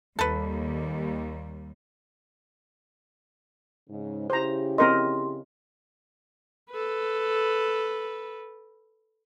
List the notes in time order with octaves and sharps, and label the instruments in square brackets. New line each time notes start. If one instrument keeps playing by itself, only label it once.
[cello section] D#2 G3 [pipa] A4 B4
[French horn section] G#2 C#3
[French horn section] C#3 E4 G4 [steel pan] C5 A#5
[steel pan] C4 A#4 D#5 [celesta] C6
[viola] A4 B4